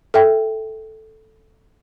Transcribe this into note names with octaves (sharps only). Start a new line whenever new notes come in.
A4 E5 G5